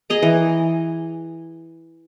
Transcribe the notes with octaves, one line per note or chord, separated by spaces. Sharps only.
G#4 D#5 A#5
E3